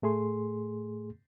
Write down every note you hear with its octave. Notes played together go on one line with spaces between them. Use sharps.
A2 A3 G#4 C6